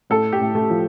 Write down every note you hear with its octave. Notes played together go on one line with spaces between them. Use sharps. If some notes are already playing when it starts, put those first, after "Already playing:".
A2 A4
G4
A2
A3
F3